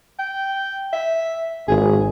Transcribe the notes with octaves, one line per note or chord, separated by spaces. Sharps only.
G5
E5
G#1 G#4